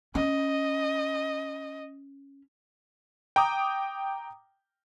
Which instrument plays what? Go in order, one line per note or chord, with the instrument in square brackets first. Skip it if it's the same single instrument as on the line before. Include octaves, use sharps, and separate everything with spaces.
[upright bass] C#4 [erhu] D#5
[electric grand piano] G5 A#5 D6 D#6